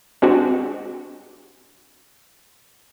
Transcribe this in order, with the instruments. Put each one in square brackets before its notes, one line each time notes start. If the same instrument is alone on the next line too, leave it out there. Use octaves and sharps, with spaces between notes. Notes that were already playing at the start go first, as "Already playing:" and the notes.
[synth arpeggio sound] G#3 C4 D4 F#4 G4